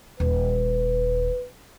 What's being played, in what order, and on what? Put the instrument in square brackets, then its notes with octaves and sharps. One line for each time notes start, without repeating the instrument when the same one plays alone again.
[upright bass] D#1 [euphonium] B4